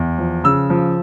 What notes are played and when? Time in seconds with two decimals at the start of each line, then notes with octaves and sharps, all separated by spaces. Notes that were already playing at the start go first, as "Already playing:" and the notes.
Already playing: E2
0.18 F3
0.44 C#3 E6
0.70 F3